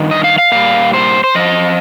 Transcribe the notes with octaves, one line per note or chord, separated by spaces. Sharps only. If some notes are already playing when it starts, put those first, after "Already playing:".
Already playing: G2 D#3
D#5
F5
F5
A#2 G3 F5
C5
C5
F2 F3 D#5